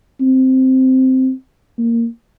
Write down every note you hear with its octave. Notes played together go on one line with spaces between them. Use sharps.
C4
A#3